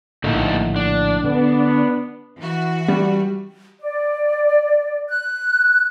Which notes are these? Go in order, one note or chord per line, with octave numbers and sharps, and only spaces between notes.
A#1 A2 D3 D#3 A3 A#3
D4
D3 B3
E3 F#4
G3
D5
F#6